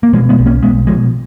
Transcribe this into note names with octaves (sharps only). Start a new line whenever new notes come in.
A#3
B2 F3 G#3
G#3 B3
B1
A#3 C#4
B1 G#3 B3
B2 F3 G#3